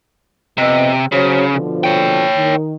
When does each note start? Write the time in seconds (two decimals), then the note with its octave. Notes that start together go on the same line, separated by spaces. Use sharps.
0.58 F2 C3 B3 D#5
1.12 C#3 F#3 C5 C#5
1.53 B2 D3 F3
1.84 C#5 G5
2.36 D#3